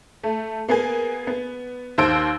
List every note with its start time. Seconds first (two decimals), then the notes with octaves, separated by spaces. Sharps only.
0.23 A3
0.68 A#3 B3 G#4 G#5
1.27 B3
1.98 D#2 D#3 C5 E6 D7